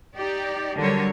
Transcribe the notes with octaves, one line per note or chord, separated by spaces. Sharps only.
D#4 G4 D5
D3 F#3 G3 A#4 C#5